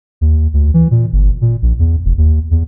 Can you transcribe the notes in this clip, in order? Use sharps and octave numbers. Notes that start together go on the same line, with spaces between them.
D#2
D2
E3
A#2
G1
A#2
A#1
E2
F1
D#2
E2